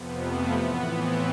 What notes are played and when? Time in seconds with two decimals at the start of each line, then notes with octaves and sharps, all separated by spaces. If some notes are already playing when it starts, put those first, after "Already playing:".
Already playing: F2 C3 F3 B3
0.21 A3
0.52 A2 E3 B3
0.83 C4